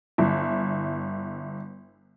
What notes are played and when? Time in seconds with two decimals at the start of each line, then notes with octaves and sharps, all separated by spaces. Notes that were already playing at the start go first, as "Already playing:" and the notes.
0.18 G1 E4